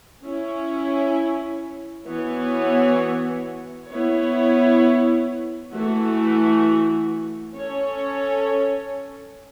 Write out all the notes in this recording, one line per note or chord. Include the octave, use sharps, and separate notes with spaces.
C#4 E4 C#5
E3 B3 F#4 C#5
B3 E4 C#5
E3 A3 F#4
C#4 A4 C#5